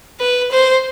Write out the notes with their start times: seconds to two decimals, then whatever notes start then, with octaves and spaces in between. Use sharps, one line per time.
0.20 B4
0.52 C5